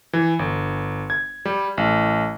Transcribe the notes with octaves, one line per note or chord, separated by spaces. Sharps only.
E3
G1
G#6
G3
A1